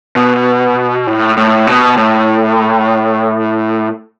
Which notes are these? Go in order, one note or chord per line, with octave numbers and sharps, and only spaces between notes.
B2
A2
A2
B2
A2